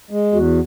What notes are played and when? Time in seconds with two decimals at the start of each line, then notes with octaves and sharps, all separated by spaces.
0.10 G#3
0.32 E2 F#4